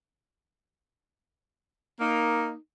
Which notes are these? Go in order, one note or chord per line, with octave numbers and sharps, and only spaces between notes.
A#3 D#4